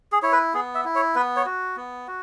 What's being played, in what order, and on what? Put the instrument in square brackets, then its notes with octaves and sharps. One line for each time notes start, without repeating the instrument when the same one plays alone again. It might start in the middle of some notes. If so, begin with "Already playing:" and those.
[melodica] G#4
E4 C#5
B4
B3 G#4
E5
E4
C#5
B3 B4
C#5
F#4
B3
F#4